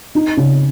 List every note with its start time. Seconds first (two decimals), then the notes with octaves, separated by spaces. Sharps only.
0.15 D#4
0.37 C#3